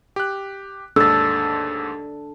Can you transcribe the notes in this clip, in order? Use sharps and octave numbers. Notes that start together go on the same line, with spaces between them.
G4 F#6
D#2 G#2 D4 A4 E6 A6